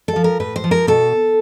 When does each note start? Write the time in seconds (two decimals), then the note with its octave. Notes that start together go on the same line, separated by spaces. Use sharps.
0.08 A4
0.16 F3
0.24 A#4
0.40 A2 B4
0.56 C5
0.64 F3
0.71 A#4
0.87 B2 A4